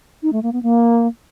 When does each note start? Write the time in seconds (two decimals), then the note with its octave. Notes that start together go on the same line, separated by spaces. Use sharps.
0.23 D#4
0.33 A3
0.43 A#3
0.53 B3
0.63 A#3